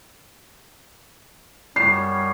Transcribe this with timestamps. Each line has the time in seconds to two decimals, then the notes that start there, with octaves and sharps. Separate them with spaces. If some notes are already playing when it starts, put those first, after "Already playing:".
1.76 F#2 G3 C#5 C7